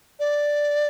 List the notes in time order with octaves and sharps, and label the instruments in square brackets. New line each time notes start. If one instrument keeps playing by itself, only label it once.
[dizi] D5